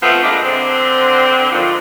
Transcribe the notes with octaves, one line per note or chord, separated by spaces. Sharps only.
F3 A3 B3 C4
A#2 G#3 D4
D3 C4
G#2 D3 D#3 F3